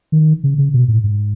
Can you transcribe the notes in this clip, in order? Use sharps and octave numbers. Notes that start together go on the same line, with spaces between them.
D#3
C#3
C#3
B2
A2
G#2